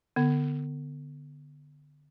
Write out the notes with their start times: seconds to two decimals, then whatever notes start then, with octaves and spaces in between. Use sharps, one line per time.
0.16 D3 B3